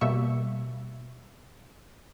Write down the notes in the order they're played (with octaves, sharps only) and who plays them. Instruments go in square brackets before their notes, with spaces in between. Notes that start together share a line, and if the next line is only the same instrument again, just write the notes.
[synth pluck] B2 G3 A#3 E5 C#6